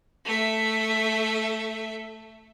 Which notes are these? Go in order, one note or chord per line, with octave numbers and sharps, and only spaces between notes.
A3 E5